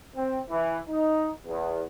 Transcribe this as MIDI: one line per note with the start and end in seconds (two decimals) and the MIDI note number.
0.15 0.39 60
0.50 0.79 52
0.89 1.29 63
1.46 1.83 40